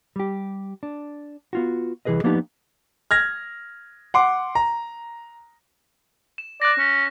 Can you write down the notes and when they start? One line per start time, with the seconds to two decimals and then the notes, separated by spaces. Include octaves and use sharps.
0.16 G3 G4
0.83 D4
1.53 B3 F4 F#4
2.05 C2 E3 F3 G#4 B4 D#5
2.24 F3 A#3 B3 D4 D#4 G4
3.11 F6 G#6 A#6
4.14 F#5 C6 D6
4.55 A#5
6.38 E7
6.62 D5 F#6 A#6
6.78 C#4